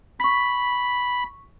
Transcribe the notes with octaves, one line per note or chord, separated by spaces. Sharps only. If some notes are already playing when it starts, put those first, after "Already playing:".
B5 C#6 B6